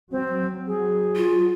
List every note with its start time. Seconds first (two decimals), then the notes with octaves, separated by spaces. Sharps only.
0.11 F#3 C4
0.67 F#3 G#4
1.16 F4